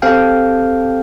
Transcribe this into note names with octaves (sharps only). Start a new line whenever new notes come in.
C4 G4 A4 F5 G5